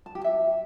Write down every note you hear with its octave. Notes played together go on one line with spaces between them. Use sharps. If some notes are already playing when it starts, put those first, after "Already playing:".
A5
G4
E5